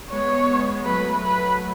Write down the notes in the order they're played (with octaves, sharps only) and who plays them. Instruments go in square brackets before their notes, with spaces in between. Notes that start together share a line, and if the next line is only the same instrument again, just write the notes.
[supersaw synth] G#3 B3 [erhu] C#5
[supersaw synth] F#3 A3 [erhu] B4
[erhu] B4